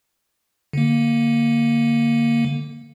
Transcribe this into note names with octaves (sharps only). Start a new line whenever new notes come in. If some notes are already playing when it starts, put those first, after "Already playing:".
D3 A#3